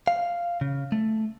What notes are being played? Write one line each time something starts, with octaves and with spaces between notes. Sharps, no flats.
F5
C#3
A3